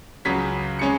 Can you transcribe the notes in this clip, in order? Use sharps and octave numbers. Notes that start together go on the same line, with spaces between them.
C#2 C#3 F#3 C#4 B6
C#3 G#3 C#4 C#7